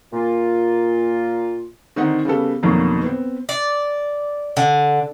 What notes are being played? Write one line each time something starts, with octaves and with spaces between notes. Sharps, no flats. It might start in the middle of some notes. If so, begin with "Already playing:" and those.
A#2 F4
D3 D#3 C4 D#4 F#5
C#3 G3 B3 A4
F2 B2 D3 D#3 F#3 A#3
B3 C4
D5
D3